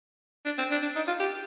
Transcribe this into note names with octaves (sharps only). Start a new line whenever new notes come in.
D4
C4
D4
D4
D#4
F4
G4